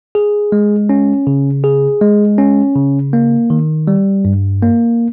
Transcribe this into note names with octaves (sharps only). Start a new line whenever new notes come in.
G#4
G#3
C#4
C#3
G#4
G#3
C#4
C#3
A#3
D#3
G3
G2
A#3